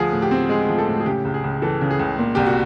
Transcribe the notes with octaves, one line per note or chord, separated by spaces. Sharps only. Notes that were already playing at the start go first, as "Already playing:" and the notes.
Already playing: D2 F3 G#4
A2
G4
C4
G#3 G#4
F3 G#4
A4
A2
G#4
C#3 G4
C#2
G#4
C#2
E3 A4
C#3
G#4
C#2
A#2
C2 G4
F#4